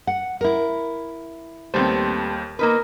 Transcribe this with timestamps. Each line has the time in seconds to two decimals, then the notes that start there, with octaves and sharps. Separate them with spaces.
0.07 F#5
0.41 E4 A#4
1.74 D#2 G3 A3 B3 C4 C5
2.59 A#3 D#4 A#4 B4